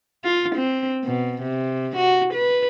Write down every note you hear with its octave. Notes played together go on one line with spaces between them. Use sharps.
F4
C4
B2
C3
F#4
B4